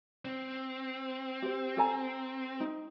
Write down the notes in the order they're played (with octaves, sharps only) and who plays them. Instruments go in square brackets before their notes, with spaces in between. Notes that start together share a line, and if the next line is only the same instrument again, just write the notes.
[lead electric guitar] C4
[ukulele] G4 C5
A4 G#5 A#5
D#4